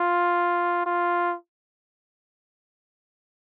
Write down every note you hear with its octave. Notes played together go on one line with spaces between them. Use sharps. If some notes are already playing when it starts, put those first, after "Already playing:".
Already playing: F4
F4